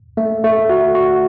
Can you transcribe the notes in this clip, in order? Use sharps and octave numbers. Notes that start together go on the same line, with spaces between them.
A3
A3
F#4
F#4